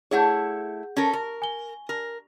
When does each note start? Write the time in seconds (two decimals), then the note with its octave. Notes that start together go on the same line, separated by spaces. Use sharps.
0.11 A3 E4 G#4 C#5 F#5 G6
0.97 C#4 A4 A#4
1.13 A#4
1.42 G#5 G7
1.89 A#4